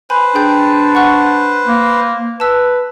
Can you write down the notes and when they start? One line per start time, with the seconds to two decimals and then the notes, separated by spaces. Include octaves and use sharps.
0.10 B4 C5 G#5 B5
0.35 D4 G#4 G5 G6
0.95 F#5 C#6 F#6
1.66 A#3
2.40 B4 A5 E6